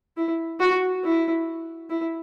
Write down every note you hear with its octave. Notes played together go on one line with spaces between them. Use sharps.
E4
F#4
E4
E4